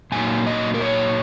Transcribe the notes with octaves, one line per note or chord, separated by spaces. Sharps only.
A#2 F#3 A#3 D#4 G#5
D#5
A#4
C#5